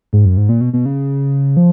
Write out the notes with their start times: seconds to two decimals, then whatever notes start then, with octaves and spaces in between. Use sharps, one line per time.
0.13 G#2
0.25 F#2
0.37 G#2
0.49 A#2
0.61 B2
0.73 B2
0.86 C#3
1.57 F3